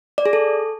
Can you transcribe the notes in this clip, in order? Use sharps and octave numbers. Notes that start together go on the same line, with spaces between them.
D5
G#4
A4